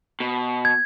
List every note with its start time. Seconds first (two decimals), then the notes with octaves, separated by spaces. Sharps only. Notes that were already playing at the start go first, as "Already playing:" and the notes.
0.20 B2
0.65 G#6